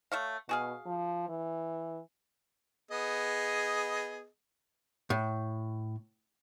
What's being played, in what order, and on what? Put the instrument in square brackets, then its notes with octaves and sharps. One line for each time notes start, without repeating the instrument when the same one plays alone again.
[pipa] A3 C#5 F5
[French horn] B2 [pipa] F#4 G#4 F5
[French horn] F3
E3
[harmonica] B3 G#4 D#5
[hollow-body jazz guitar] A2